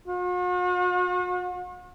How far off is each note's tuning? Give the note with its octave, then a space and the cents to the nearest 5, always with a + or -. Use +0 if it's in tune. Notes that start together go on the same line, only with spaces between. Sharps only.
F#4 -45